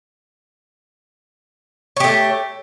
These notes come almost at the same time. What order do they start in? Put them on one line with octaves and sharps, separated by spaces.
C#5 G4 A3